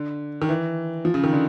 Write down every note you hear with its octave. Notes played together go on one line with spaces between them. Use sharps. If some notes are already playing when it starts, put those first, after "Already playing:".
Already playing: D3
D#3
E3
F3
C#3
D#3
D3